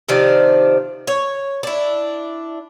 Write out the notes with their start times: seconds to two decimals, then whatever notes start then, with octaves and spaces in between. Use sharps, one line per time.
0.09 C3 D#3 F3 D4
1.07 C#5
1.63 D4 E4